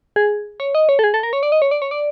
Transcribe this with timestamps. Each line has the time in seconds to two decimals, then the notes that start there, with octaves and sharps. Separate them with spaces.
0.16 G#4
0.60 C#5
0.75 D#5
0.89 C#5
0.99 A4
1.04 G#4
1.14 A4
1.23 A#4
1.33 C#5
1.43 D5
1.52 D#5
1.62 C#5
1.71 D5
1.82 C#5
1.91 D5